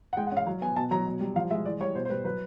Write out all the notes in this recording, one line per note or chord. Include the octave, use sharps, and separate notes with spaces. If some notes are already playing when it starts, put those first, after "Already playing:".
F#5
G#3 G5
F#5
C#4 F5
F#3
B3 G#5
B2 A5
F#3 A#5
B2
G3
F3 F5
G#3 E5
E3 D5
G3 C#5
B2 C5
C5
G3 B4
F#3 B4